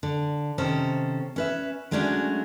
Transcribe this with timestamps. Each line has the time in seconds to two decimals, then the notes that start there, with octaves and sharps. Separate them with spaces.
0.03 D3
0.58 C3 D#3 C#4 A4 C5
1.36 C#4 B4 E5
1.91 F#3 G#3 A3 C#4 D4 F#4